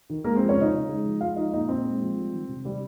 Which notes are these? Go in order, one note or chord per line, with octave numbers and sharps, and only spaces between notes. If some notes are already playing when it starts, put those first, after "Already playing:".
D#3
G#3 A#3 A#4
F3 C4 C5
C#4 C#5
C#3 D#4 D#5
C#3
G#3
F3
G#3 F4 F5
F3 D#4 D#5
A#2 D#4 D#5
A#2 C4 C5
G#3
F3
G3
D#3
C3
C3 G3 G4